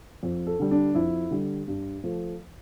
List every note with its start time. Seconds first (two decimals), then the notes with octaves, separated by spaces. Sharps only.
0.23 F2
0.47 A4
0.59 D3 G3
0.71 D4
0.95 F2 E4
1.31 D3 G3
1.68 G2
2.04 F3 A3